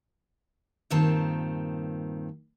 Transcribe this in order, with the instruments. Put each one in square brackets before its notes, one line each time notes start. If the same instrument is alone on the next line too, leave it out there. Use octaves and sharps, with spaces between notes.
[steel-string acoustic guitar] G2 A#2 D#3 C4 A5